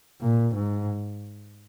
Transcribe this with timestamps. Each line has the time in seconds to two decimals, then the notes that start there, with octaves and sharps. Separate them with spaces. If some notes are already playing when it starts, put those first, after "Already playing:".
0.22 A#2
0.55 G#2